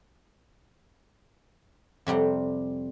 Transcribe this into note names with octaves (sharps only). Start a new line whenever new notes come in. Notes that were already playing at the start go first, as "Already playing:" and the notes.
F2 C3 G3 F#5